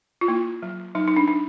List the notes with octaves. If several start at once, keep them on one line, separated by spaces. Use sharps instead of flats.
F4
A#3 E4
F#3
F#3 D#4
D#4
D4
D4